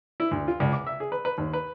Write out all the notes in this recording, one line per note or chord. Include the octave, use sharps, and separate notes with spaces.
E4
D2
F4
C#2
D6
E5
G#4
B4
B4
D#2
B4